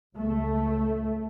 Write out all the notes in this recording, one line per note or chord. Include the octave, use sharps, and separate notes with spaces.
C#2 A3